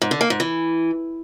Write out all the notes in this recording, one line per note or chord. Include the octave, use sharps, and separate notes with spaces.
G#2
D3
A#3
G#2
E3